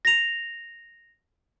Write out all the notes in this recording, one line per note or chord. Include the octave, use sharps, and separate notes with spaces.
A#6 F7